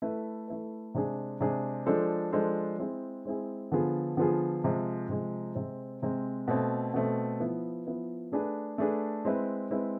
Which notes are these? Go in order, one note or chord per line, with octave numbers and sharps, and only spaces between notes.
A3 E4 B4
A3 E4 B4
C3 G#3 D4 G#4
C3 G#3 D4 G#4
F3 G#3 D4 A4 C5
F3 G#3 D4 A4 C5
G#3 C4 E4 G#4
G#3 C4 E4 G#4
D3 F3 B3 F4 G#4
D3 F3 B3 F4 G#4
C3 F3 G#3
C3 F3 G#3
C3 G#3 C4
C3 G#3 C4
B2 A3 C4
B2 A3 C4
F3 B3 E4
F3 B3 E4
A3 D4 G#4 B4
A3 D4 G#4 B4
G#3 C4 E4 B4
G#3 C4 E4 B4